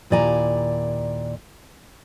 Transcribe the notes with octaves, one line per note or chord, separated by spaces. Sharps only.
D#2 A#2 E4 D5 G#5 A#5